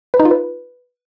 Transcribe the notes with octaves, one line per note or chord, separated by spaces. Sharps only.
B4
D#4
F4
B4